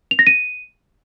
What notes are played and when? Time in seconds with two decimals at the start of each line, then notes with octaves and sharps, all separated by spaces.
0.11 F7
0.19 A#6
0.27 D#7